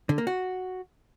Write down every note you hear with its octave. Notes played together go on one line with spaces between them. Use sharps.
D3
A#3
F#4